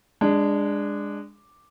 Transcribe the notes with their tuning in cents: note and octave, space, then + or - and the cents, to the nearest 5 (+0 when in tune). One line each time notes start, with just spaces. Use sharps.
G#3 -20 D4 +0